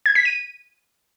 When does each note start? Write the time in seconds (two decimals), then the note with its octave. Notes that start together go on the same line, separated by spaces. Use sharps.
0.06 G#6
0.15 B6
0.25 D#7